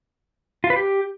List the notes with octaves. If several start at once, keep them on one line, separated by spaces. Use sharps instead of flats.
F4
B4
G4